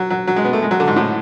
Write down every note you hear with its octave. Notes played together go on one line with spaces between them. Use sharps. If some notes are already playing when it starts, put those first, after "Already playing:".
Already playing: F#3
F#3
F#3
G#3
B3
A3
G#3
F#3
D3
G#2
A2